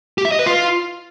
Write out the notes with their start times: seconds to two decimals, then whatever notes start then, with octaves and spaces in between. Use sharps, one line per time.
0.18 G4
0.25 E5
0.32 D#5
0.39 B4
0.46 F4